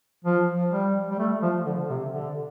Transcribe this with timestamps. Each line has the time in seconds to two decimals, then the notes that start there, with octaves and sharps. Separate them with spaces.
0.25 F3
0.72 G3
1.11 G3
1.19 A3
1.42 F3
1.66 D3
1.90 C3
2.13 D3